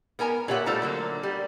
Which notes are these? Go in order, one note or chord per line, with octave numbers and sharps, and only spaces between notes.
B3 A#4 G#5 A#5
A#2 G4 C#5 E5 F#5
G3 A3 F4 A4 C5 A#5
D3 F#3 A#3
G3